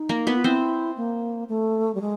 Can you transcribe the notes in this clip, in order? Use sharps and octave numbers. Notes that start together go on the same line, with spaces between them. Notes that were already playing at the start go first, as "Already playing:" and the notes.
Already playing: D#4
A#3 A#4
B3 B4
F4
C4 E4 C5
A#3
A3
G3
G#3